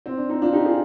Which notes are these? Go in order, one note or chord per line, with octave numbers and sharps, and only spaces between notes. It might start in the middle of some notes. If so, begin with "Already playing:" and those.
C4
D4
C4 D#4
D4 F4
D#4 G4
F4 G#4